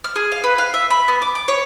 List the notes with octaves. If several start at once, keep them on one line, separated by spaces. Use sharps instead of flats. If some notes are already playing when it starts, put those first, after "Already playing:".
F6
G#4
F5
B4
F5
E5
B5
B3
D6
D6
C#5